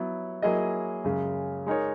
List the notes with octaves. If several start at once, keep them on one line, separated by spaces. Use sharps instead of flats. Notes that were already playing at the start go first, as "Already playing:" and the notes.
Already playing: F#3 B3 E4
F#3 A#3 E4 G#4 D#5
F#2 C#3 G#3
G#3 D#4 A#4 C#5